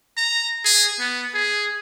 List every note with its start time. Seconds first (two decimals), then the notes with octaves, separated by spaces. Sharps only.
0.17 A#5
0.65 G#4
1.00 B3
1.34 G#4